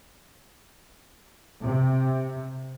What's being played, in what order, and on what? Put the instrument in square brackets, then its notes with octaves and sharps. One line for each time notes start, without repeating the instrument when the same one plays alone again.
[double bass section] C3